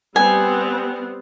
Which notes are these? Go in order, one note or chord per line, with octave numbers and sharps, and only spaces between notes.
G3 B3 C4 G#5